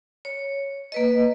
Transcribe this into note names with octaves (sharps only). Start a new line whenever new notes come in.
C#5
A#3 B4 D#5